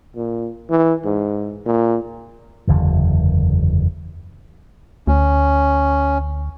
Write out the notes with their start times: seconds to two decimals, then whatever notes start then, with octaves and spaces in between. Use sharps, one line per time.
0.16 A#2
0.70 E3
1.05 G#2
1.66 A#2
2.67 F#1 E2 D3
5.07 D2 C#4